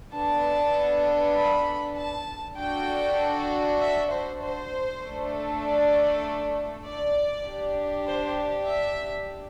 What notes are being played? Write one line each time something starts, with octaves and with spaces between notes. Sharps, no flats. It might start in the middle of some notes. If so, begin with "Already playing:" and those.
B3 D4 A4 A5
B5
A5
D4 F#4 A4 G5
E5
C5
C5
A3 D4 A4
D5
D5
D4 G4
C5
E5